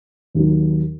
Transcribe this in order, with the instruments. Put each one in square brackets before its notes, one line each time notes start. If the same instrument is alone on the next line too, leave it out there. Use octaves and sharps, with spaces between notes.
[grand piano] D#2 D#3 F#3